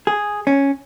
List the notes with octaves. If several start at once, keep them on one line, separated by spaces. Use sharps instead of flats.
G#4
C#4